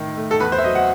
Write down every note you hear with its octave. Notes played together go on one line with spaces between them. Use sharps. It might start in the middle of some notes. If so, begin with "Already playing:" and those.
Already playing: A2 D#3
A3
A4
E2 B4
C5
E5
F#3 D#5
F#5